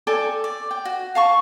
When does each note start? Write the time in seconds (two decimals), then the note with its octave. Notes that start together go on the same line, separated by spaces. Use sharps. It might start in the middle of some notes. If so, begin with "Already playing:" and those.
0.07 A4 D5 G5 G#5
0.44 D5
0.71 G5
0.85 F#4
1.15 F5 A5 C#6